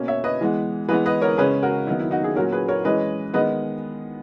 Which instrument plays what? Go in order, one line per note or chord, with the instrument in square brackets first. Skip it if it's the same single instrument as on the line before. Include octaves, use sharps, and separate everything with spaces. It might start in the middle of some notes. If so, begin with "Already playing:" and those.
Already playing: [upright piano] B2 A#3 C#4
C#5 E5
B4 D#5
E3 G#3 B3
E3 G#3 B3 B4 D#5
B4 D#5
A#4 C#5
C#3 G#3 C#4 G#4 B4
F#4 A#4
D#3 F#3 B3 E4
E4
D#4 F#4
E4 G#4
A#2 F#3 C#4 F#4 A#4
G#4 B4
A#4 C#5
E3 G#3 C#4 B4 D#5
D#3 G#3 B3 B4 D#5